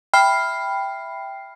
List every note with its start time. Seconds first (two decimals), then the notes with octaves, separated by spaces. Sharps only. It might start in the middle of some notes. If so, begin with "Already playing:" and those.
0.14 E5 G5 B5 F6 C7